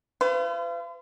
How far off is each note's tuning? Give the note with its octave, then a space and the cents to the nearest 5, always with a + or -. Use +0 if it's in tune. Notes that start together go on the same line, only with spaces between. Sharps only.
F4 -40 B4 +45